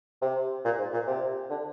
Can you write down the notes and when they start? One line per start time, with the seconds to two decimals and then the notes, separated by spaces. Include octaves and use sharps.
0.22 C3
0.65 A#2
0.78 G#2
0.93 A#2
1.07 C3
1.50 D3